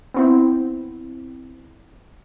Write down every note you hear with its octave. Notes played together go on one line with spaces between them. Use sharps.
B3 C4 E4